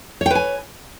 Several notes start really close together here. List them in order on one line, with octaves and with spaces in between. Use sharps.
C#5 G5 B4 G#5